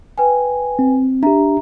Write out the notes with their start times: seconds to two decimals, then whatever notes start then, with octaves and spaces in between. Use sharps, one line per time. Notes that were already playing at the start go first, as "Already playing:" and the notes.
0.18 B4 G5 G#5
0.79 C4
1.23 D4 G4 E5 A#5